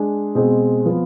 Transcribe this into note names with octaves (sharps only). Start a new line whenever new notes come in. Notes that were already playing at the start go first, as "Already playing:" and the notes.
Already playing: G#3 D4 G#4
B2 G#3 C4 G#4
F3 B3 F4